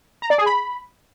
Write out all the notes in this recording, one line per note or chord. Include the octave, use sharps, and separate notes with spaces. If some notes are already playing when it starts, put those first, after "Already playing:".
A#5
D5
G#4
B5